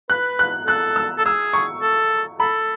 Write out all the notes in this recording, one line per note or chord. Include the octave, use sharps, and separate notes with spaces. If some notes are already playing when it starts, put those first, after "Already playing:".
B4 F#6
F#6
A4 F#6
E6
A4
G#4 E6
C#6
A4
A4 B5